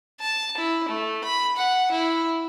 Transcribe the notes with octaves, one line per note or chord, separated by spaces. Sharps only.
A5
E4
A3
B5
F#5
E4